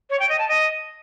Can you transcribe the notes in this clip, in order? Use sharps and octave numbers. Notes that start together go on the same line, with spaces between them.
C#5
G5
D#5
A5
D#5